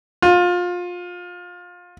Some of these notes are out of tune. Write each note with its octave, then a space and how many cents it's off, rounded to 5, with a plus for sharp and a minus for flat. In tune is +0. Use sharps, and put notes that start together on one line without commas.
F4 +25